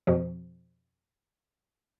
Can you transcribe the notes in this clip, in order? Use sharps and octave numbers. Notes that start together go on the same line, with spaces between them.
F2 B2 F3